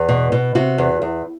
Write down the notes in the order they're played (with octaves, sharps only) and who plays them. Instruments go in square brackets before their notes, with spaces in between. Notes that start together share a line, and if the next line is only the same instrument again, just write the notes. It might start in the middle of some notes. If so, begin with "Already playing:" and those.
Already playing: [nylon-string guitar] E2
B2
B2
C3 F#4
E2
E2